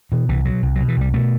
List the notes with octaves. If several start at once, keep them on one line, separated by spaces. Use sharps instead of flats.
B2 E3
C2 E3
B2 F#3
C2
B2 F#3
E3
C2 G3
B2 A3